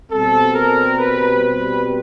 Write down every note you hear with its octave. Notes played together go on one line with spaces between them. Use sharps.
B2 G3 C4 A4
A#4
B4
B4